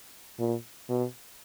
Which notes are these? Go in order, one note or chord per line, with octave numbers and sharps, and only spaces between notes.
A#2
B2